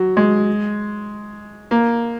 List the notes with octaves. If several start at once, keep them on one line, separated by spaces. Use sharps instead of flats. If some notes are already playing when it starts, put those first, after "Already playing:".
Already playing: F#3
G#3
A#3